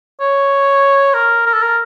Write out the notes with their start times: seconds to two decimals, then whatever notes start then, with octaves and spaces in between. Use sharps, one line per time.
0.20 C#5
1.14 A#4
1.46 A#4
1.53 A4
1.62 A#4